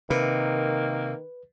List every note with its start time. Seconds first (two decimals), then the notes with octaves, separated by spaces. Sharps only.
0.10 C3 D#3 A#3 B4